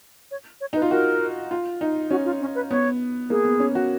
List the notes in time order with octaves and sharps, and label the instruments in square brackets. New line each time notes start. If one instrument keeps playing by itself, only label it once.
[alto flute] C#5
C#5
[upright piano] D#4 [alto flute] B4
[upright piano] F4
[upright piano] F#4 [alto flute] A#4
[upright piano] F4
D#4
[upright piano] C#4 [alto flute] F#4
[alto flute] F4
C#4
B4
[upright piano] B3 [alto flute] C#5
[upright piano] A#3 [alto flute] G#4
[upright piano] B3
C#4
F#4